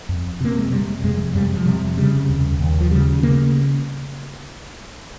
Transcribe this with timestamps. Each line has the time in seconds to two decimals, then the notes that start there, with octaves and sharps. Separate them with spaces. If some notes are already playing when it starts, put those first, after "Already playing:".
0.09 F2
0.41 C3 A#3
0.58 G#3
0.72 C3 G3
1.04 F2 G#3
1.35 F2 G3
1.56 F3
1.66 C3 G3
1.97 C#3 G3
2.29 D#2
2.60 D#2
2.81 F3
2.91 C#3 G3
3.23 C#3 A#3